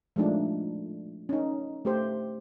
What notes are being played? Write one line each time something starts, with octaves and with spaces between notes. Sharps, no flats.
F3 G#3 A3 D4 D#4
C#4 D#4
A3 G4 C5